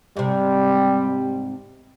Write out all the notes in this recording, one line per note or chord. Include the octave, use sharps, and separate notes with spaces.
G#2 C3 G3